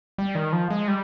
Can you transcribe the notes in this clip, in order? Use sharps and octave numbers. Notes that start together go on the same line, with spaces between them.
G3
D#3
F3
G#3
G3